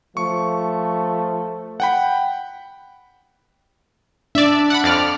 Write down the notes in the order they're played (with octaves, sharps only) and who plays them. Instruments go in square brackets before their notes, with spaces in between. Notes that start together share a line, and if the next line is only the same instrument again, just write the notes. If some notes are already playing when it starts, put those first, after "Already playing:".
[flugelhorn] F3 [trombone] A3 [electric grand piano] C#6
[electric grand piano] F#5 G5 B5
[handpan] D4 [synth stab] D5 E5
[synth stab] F#5 B5
F2 D5 F6